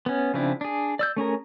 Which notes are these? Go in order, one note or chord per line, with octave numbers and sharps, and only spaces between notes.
B3 C#4
C#3 F3 C4 D4 E4
D4 G#4
D5 E6 G6
A3 C#4 G#4 A#4